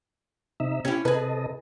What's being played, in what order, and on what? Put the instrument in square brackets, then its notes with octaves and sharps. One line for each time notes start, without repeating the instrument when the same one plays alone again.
[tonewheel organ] C3 D#4 E5
[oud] C#4 E4 [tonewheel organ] G4
[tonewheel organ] C3 A4 D#5 [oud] G#4 B4